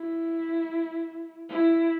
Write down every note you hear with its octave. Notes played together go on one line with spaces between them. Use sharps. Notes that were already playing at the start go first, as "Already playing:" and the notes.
Already playing: E4
E4